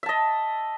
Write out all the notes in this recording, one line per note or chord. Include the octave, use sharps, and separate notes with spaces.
D#5 E5 A5